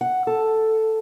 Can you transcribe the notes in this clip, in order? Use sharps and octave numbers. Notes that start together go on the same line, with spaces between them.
F#5
A4